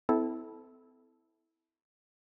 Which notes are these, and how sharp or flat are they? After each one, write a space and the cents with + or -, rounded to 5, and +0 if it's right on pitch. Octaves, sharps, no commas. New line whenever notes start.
C4 -45 E4 -15 A4 -10